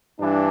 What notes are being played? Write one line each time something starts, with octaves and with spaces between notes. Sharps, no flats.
G2 E3 D4